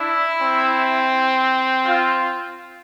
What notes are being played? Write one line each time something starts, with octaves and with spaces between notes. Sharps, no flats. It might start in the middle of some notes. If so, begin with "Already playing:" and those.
Already playing: D4 E4
C4
F4